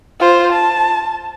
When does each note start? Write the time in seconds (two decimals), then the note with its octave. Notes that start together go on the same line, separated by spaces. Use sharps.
0.20 F4 C5
0.52 A5